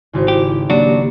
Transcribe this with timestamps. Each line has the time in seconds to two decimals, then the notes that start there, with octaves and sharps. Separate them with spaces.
0.14 G#1 C#3 E4 F#4 C5
0.28 E4 G4
0.70 F#3 A#3 D4 F#4 G4